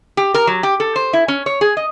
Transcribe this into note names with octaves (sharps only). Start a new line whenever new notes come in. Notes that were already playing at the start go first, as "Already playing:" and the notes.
G4
A#4
F#3
G4
A4
C5
E4
C#4
C#5
G#4
D#5